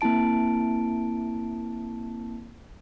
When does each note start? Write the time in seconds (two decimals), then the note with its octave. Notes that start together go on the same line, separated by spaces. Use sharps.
0.01 A#3 C4 E4 A5 D7